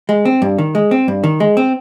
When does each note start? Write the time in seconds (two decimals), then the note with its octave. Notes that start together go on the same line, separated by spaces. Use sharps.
0.09 G#3
0.25 C4
0.42 G2
0.58 D#3
0.75 G#3
0.91 C4
1.08 G2
1.24 D#3
1.40 G#3
1.57 C4